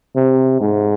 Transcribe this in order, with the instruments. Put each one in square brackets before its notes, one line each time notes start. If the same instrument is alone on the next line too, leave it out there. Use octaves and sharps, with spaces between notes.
[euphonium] C3
G#2